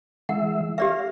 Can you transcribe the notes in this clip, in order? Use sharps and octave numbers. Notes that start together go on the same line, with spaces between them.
E3 G#3 E5 F#5
G4 D5 E5 F5